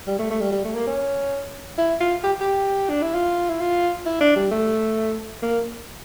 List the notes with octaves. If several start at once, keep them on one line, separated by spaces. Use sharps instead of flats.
G3
A3
A3
G3
G3
A3
A#3
C#4
E4
F4
G4
G4
D4
E4
F4
E4
F4
E4
D4
G3
A3
A#3